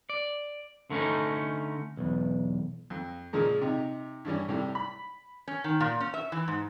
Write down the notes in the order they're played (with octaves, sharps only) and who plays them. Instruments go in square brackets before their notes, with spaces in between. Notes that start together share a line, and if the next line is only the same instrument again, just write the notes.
[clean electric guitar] D5
D3 A3 A#3 C#4 D#4
B1 E2
[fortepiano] F2
A#2 C#3 F3 G#3 A#3
C3 D#4
G2 E3 G3 C#4
A2 C3 G3
B5
[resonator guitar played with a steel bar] C#4
D#3
A#2
C#4
E5
E3
G#2